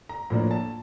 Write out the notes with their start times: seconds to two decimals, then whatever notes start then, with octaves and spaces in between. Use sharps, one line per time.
0.09 A#5
0.30 A2 F3 A#3 D4 A#5
0.51 A5